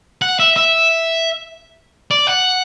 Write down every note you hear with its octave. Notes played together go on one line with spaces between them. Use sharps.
F#5
E5
E5
D5
F#5